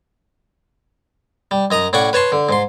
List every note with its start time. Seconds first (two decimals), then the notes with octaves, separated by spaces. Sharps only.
1.51 G3
1.71 F#2 D#5 A#5 D#6
1.93 A2 C#4 D5 F#5 C#6
2.13 B4 C#5 A5 C6
2.32 D3
2.49 G#2 C6